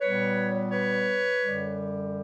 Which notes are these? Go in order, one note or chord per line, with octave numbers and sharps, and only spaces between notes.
A#2 G3 B3 B4 C#5
B4 C#5
F#2 D3 G3